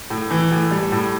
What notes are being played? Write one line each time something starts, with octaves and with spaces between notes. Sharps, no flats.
A2
E3
A2
G3
A2